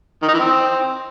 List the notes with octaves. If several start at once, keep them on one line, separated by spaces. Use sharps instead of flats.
D#3
D#4
E3
C4